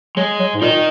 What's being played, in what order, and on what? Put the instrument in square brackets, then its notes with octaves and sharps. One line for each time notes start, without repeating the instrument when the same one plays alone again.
[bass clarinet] F#3 [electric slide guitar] G#3
[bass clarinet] F#3
G#2
[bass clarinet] A#2 [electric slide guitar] D#4 A#4 D#5